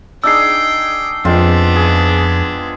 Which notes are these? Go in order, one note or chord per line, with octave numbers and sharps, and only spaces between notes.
D4 D#4 G#4 G5 E6 C7
F2 G#3 B3 C4 D4 F4
G#4